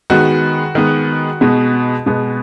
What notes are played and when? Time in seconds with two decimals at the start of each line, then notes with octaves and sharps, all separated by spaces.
0.10 D#3 G#3 B3 F#4
0.75 D#3 G#3 B3
1.41 B2 G#3 B3
2.06 B2 G#3 B3